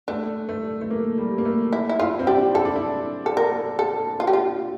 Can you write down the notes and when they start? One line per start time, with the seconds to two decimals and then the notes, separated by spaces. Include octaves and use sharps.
0.08 A3 D4
0.49 A3
0.81 A3
0.90 A#3
1.18 G3
1.38 A#3
1.45 A3
1.73 E4
1.89 E4
1.99 E4 F4
2.19 C4
2.27 D4 G4
2.54 E4 A4
2.65 D4
2.76 E4
3.26 A4
3.37 A#4
3.79 A4
4.20 F4
4.27 G4
4.33 F4